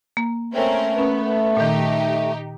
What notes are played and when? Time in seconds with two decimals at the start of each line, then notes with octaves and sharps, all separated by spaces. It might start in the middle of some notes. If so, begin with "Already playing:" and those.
0.17 A#3
0.54 A3 C4 C#4 A#4
0.98 B3 C#4
1.57 A#2 D#3 D#4 G4